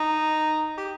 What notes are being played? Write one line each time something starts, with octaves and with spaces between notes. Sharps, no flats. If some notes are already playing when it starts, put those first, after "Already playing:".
Already playing: D#4
G4